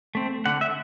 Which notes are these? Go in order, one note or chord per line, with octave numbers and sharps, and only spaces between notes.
A3 C4
D3 F#5
E5